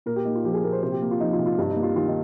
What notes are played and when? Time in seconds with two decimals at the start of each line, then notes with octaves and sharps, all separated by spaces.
0.06 A#2 A#4
0.16 G4
0.25 A#3 D#4
0.35 F4
0.44 F3 G4
0.54 G#4
0.63 A#2 A#4
0.72 C5
0.83 C3 C5
0.92 G4
1.02 A#3
1.11 F4
1.20 F3 D#4
1.33 F4
1.39 C3
1.46 F4
1.58 G2 D#4
1.70 D#4
1.76 A#3
1.83 F4
1.96 D#3 F4
2.08 D#4